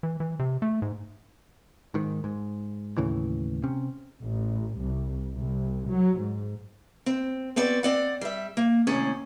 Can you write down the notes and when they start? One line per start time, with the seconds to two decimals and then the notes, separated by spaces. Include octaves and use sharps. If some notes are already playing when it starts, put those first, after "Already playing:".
0.03 E3
0.20 E3
0.39 C3
0.62 A3
0.82 G#2
1.94 G#2 D#3
2.24 G#2
2.97 D#2 A2 C#3 E3
3.63 C3 C4 C#4
4.24 A1
4.78 C2
5.35 C2
5.89 F#3
6.18 G#2
7.06 C4
7.56 B3 C4 F#4 D5
7.83 C4 D5 F#5
8.21 G3 E5
8.57 A#3
8.87 D#2 A2 C3 C#4 D5